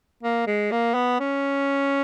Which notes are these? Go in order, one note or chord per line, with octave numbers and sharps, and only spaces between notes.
A#3
G#3
A#3
B3
C#4